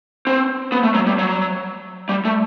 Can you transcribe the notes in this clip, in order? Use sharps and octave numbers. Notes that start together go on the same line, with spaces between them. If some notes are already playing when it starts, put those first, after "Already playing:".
C4
B3
A3
F#3
G3
F#3
G3
A3